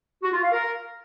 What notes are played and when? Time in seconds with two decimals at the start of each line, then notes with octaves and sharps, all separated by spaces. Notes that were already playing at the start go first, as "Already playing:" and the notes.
0.23 F#4
0.33 F4
0.43 F5
0.52 A#4